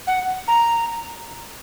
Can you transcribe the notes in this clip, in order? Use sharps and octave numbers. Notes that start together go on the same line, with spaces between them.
F#5
A#5